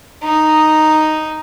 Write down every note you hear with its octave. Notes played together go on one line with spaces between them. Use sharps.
D#4